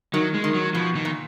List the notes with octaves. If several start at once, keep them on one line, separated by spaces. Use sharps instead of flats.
D#3 F#3
G#3
D#3
F#3
B2 F3
D#3
A#2